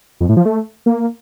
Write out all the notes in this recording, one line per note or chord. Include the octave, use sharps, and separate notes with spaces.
F2
A2
F3
A3
A#3